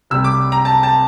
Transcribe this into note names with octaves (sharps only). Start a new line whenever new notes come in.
C2 C3 G3 E6
D6
A#5
A5
A5